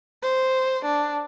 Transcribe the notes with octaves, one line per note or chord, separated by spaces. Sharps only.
C5
D4